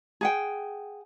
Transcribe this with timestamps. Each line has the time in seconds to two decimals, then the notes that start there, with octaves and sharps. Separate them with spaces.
0.21 G#4 F#5 G5